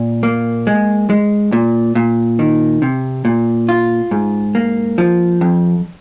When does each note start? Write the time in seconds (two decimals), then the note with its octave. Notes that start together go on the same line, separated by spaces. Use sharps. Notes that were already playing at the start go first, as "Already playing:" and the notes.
Already playing: A#2
0.23 A#3
0.67 G#3
1.10 G#3
1.52 A#2
1.95 A#2
2.39 D#3
2.82 C3
3.25 A#2
3.69 F4
4.11 G#2
4.55 A#3
4.98 F3
5.41 F2